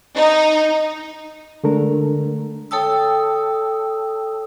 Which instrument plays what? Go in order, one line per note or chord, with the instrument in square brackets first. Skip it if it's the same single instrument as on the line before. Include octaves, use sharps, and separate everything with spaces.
[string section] D#4
[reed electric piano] D3 G#3 A3 D4 A4 A#4
[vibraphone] A4 C#5 G5 A5 D#6 E6